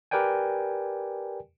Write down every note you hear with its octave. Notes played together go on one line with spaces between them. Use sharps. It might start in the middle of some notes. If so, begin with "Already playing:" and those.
G4 A#4 B4 D5 G5 G#5